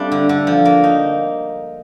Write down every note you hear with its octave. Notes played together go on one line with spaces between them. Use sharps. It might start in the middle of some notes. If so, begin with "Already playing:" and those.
Already playing: G3 A3 C4 D4 F4
D3
D3
F3
A#3
D#4